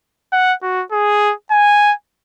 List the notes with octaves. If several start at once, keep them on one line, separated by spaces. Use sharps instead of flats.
F#5
F#4
G#4
G#5